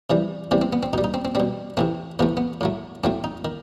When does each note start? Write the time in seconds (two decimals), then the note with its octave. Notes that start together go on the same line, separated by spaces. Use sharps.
0.10 C3 E3 G3
0.51 C3 E3 G3 C4
0.62 C4
0.73 B3
0.83 C4
0.93 B2 D#4
0.98 G3
1.04 D#4
1.14 C4
1.25 C4
1.35 B2 G3 C4
1.77 C3 E3 A3 C4
2.19 C3 E3 A3 B3
2.37 B3
2.61 A2 F#3 A3
3.04 A2 F#3 A3 C4
3.24 D#4
3.45 D#3